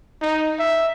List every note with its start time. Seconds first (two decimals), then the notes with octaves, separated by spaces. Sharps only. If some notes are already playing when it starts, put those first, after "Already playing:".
0.22 D#4
0.59 E5